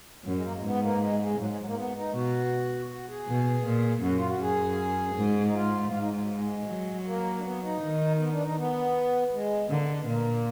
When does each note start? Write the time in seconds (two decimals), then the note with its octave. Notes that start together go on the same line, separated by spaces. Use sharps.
0.24 F#2 F#3
0.34 G#3
0.44 A#3
0.53 G#3
0.63 G#2 B3
0.82 A#3
1.00 G#3
1.20 G#3
1.38 G#2 F#3
1.48 G#3
1.57 F#3
1.67 A#3
1.76 B3
1.95 D#4
2.14 B2 F#4
2.89 F#4
3.08 G#4
3.28 B2
3.64 A#2
4.02 F#2 F#4
4.16 F4
4.28 F#4
4.40 F#2 G#4
5.16 G#2
5.46 D#4
5.54 F4
5.91 G#2 F4
6.01 D#4
6.11 G#3
6.20 F#3
6.29 G#3
6.67 F#3
7.05 A#3
7.37 D4
7.43 B3
7.62 D#4
7.81 D#3
8.18 B3
8.32 D4
8.44 D#4
8.56 B3
9.33 G#3
9.69 D3 A#3
9.79 B3
9.89 D4
9.98 B3
10.07 A#2 A#3